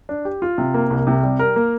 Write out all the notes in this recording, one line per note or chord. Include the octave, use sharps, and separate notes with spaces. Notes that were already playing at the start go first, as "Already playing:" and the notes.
D4
G4
F4
C3
A#3
C2
C3
G3
A#4
A#3